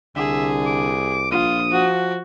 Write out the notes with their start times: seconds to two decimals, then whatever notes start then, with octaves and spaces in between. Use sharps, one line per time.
0.16 C2 D3 G#4 E5
0.65 D6
1.31 A#1 F4 D#6
1.71 F3 F#4